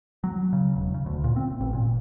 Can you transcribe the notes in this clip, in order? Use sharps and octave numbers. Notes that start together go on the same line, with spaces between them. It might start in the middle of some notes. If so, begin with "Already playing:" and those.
F#3
C#3
E1
C#3
D2
A#2
C4
A1
A#2